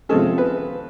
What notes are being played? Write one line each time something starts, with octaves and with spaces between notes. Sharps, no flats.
C3 F3 G#3 C#4 A4
B4